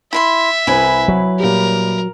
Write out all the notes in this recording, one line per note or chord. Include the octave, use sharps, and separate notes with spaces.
E4 E5 B5 C6
C2 C4 E4 B4 G#5
F#3
A#2 G3 A#4